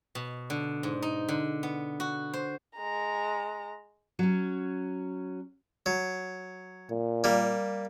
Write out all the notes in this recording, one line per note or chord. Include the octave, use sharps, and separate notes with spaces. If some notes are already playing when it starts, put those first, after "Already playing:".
B2
D3
G#2
D#4
D3
B3
F#4
C5
G#3 A#5
F#3 C#4
F#3
A#2
G3 A#3